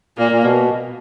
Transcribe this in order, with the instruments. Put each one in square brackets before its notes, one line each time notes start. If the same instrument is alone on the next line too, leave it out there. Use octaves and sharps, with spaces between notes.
[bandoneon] A#2 [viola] A#3
[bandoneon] A#2
B2